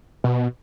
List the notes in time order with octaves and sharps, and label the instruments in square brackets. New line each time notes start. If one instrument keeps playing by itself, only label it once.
[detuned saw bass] B2